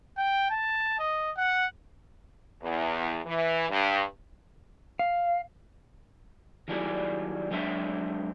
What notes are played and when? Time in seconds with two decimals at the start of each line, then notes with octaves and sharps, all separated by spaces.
0.17 G5
0.50 A5
0.99 D#5
1.37 F#5
2.63 E2
3.26 E3
3.70 G2
4.99 F5
6.68 D#3 F#3 G3 E4 G#4 D5
7.51 F#3 G#3 C4 D4 E5